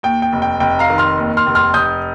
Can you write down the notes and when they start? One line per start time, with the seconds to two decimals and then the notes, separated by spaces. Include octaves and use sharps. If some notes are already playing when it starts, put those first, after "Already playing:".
0.03 D#2 G5
0.22 G5
0.33 F1
0.42 G5
0.60 F1 G5
0.79 F5 A#5
0.90 D#3
0.98 C6 F6
1.18 D#2
1.37 C6 F6
1.47 F1
1.55 C6 F6
1.74 F1 D#6 G6